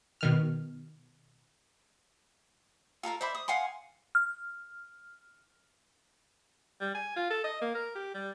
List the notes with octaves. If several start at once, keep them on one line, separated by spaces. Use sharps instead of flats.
B2 D#3 F6
F4 A4 A#4 F5
C5 D5 E5 B5
D#6
F5 F#5 G#5 C6
F6
G3
G#5
F4
A4
D#5
A#3
A#4
G4
G3